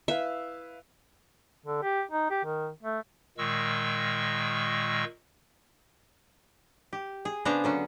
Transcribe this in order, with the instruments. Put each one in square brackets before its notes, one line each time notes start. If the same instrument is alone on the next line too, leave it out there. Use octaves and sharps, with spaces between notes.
[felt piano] E4 B4 F5 [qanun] E5
[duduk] D3
G4
D#4
G4
D#3
A3
[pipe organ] A#2 D#3 G#3 C#6 E6
[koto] G4
G#4
C#3 B3 D4 G#4 C5 A#5
D3 F#3 C#4